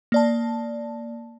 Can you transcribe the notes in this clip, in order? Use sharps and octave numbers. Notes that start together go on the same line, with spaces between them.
A#3 D5 A5